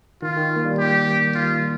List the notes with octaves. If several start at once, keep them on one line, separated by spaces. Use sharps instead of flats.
D#3 F4
D#3
A#3
G3
G4
F4